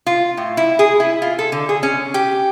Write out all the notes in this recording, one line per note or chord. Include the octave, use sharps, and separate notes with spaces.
F4
A2
E4
G#4
E4
F4
A4
D3
G#4
C#4
G4